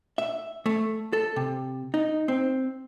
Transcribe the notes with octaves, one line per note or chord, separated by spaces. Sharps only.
E5
A3
A4
C3
D#4
C4